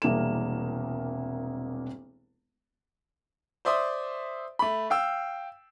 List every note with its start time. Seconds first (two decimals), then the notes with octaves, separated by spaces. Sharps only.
0.02 E1 C2 A#3 A#4 E7
3.65 C5 D5 E5 C6 D#6
4.59 A3 B5
4.90 F5 G5 E6